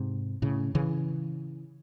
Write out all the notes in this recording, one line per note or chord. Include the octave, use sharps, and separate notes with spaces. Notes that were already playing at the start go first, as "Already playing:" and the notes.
Already playing: G#2 C3
A2 C#3
C#3 E3